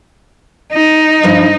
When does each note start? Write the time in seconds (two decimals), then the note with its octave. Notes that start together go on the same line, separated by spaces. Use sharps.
0.72 D#4
1.23 G2 F3